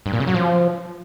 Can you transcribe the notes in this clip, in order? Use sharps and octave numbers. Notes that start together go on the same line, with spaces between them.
G2
A#2
C#3
F#3
F3